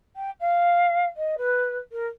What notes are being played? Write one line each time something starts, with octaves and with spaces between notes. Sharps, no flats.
G5
F5
D#5
B4
A#4